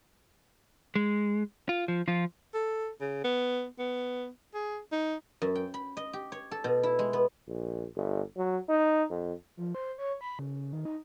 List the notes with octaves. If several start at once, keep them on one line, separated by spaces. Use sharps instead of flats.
G#3
F4
F3
F3 F4
A4
C#3
B3
B3
G#4
D#4
F#2
G5
B5
D#5
G4
C#5
A4
B2
E4
G#3
B3
A#1
G1
F#3
D#4
F2
F3
C5
C#5
B5
C#3
D#3
D#4